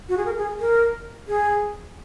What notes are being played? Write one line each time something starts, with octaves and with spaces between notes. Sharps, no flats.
F#4
G#4
A#4
G#4
A#4
G#4